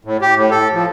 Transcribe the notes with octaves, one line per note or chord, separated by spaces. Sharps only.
A2
G4
A2
A4
F3